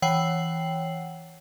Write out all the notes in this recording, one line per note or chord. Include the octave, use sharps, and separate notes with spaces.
E3 C#5 F#5 G5 C7 F#7